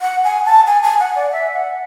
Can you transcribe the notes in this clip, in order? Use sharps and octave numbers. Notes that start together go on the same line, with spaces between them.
F#5
G#5
A5
G#5
G#5
F#5
D5
E5
F#5